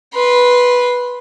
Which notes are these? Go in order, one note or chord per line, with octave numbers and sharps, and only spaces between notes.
B4 C6